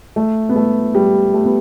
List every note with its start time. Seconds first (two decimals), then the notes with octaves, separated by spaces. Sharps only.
0.16 A3
0.49 B3
0.56 A3
0.95 G3
1.34 A3
1.44 B3